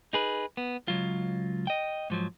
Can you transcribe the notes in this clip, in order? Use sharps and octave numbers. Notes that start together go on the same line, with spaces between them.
D#4 G#4 B4
B3
C#2 F#3 F4
D#5 G5
G#2 F3 F#3